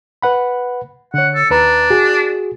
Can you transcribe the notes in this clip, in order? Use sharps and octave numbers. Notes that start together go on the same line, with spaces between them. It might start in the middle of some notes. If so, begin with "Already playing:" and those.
B4 F#5 B5
D3 C#5 F#5
A4
D#2 D4 B4 A#5
F#4 G#4